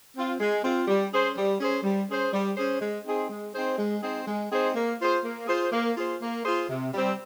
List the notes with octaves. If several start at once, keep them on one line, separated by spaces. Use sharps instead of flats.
C4 F4
G#3
C4 F4
G3
C#4 G#4 C5
G3
C#4 G#4 C5
G3
C#4 G#4 C5
G3
C#4 G#4 C5
G#3
C4 D#4 G#4 C5
G#3
C4 D#4 G#4 C5
G#3
C4 D#4 G#4 C5
G#3
C4 D#4 G#4 C5
A#3
F4 G#4 C5
A#3
F4 G#4 C5
A#3
F4 G#4 C5
A#3
F4 G#4 C5
C3
G3 C4